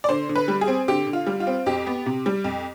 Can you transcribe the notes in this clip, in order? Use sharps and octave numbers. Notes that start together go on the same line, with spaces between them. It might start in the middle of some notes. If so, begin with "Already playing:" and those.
D5
D3 C5
D3
B4
G3
G#4
C4
D3 G4
D3
F4
G3
F4
C4
F2 G4
B3
C3
G3
F2